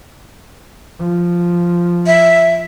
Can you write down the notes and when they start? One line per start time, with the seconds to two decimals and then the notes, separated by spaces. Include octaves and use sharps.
0.99 F3
2.07 E5